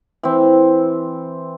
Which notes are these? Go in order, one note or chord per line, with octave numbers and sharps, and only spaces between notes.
E3 C4